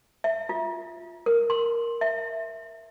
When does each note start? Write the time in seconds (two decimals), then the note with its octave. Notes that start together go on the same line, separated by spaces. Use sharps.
0.24 E5
0.49 F4
1.26 A#4
1.50 C6
2.01 E5